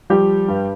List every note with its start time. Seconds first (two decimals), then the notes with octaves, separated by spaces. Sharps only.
0.10 F3 G3 G4
0.48 G2